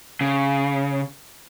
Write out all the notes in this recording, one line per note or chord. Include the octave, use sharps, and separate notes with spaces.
C#3